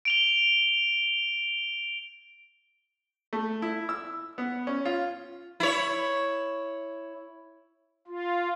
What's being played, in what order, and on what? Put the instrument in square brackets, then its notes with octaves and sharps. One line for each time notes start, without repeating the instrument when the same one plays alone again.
[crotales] D7 F7 G7
[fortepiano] A3
E4
E6
B3
C#4
F4
[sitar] E4 C#5
[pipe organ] F4